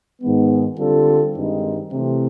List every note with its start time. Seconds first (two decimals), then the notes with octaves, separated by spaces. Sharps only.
0.22 G#2 D#3 G#3 B3
0.78 D3 G3 C4 F4 A4
1.35 G2 D#3 G#3 C4 D#4
1.91 C3 E3 A3 C4